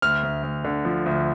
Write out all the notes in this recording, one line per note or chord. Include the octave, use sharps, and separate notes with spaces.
D2 F6
D2
D2
D3
F3
D2